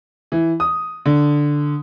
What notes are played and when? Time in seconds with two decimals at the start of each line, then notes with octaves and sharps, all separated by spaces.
0.32 E3
0.60 D#6
1.06 D3